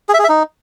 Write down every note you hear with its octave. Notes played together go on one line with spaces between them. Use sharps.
G#4
E5
G#4
E5
D#4